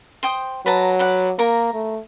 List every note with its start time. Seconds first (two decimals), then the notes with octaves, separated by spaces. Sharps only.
0.23 C5 G5 D#6
0.66 F#3 B4 A5 A#5
0.99 B4 D5 F#5
1.39 A#3 A#4 A#5
1.74 A3